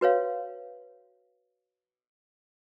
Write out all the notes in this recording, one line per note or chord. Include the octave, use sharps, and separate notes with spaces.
F#4 B4 C#5 F5